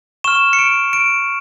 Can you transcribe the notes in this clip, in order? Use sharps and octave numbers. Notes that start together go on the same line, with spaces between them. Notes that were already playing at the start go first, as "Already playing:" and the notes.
C#6 F6 E7
C#7
D7
D7